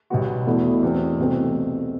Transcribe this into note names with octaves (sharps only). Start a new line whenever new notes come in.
B1 B2 G3 B3 F#4
E2 B2 A3 E4
E2 B2 A3 C4
C2 B2 A3 C4